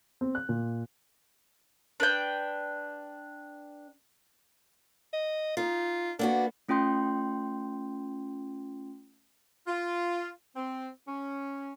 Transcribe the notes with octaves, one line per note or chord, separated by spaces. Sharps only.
C4
F#6
A#2
D4 B4 G5
D#5
D#4 F4
A#3 B3 D4 F#4
A3 C#4 F4 G5 C6 G6
F4
C4
C#4